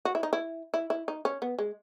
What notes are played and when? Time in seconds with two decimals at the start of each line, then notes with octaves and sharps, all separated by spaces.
0.05 F#4
0.15 E4
0.23 D#4
0.33 E4
0.74 E4
0.90 E4
1.08 D#4
1.25 C#4
1.42 B3
1.59 G#3